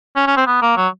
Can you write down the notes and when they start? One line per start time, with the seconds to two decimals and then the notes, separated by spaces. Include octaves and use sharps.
0.16 C#4
0.27 C#4
0.37 C4
0.47 B3
0.62 A#3
0.77 F#3